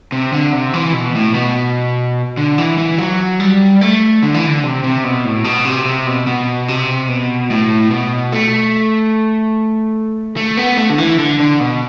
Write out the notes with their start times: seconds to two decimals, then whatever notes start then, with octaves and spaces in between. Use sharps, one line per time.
0.12 C3
0.33 D3
0.53 C3
0.74 E3
0.93 B2
1.15 A2
1.35 B2
2.37 D3
2.58 E3
2.78 E3
2.98 F#3
3.40 G3
3.81 A3
4.23 D3
4.34 E3
4.47 D3
4.63 C3
4.84 C3
5.04 B2
5.25 A2
5.44 B2
5.65 C3
5.85 C3
6.07 B2
6.27 B2
6.68 C3
7.09 B2
7.50 A2
7.91 B2
8.32 A3
10.37 A3
10.57 B3
10.78 A3
10.90 D3
10.98 E3
11.19 D3
11.39 D3
11.60 B2